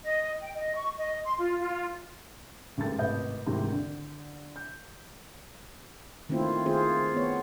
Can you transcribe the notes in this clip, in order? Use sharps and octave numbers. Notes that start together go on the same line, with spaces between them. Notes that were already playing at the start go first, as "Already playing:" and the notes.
D#5
G5
D#5
C#6
D#5
C6
F4
F4
A1 D#2 G#2 A4 A6
G#1 A2 C3 B4 D#5 G6
G#1 D2 G#2 C3 D#3 E3
D3
G6
D#3 A3 A#3 C4 E4 F4
D#3 C4 F4 G#4 C5
B3 C#5